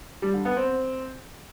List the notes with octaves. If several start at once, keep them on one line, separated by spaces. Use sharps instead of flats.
G3
D3
B3
C4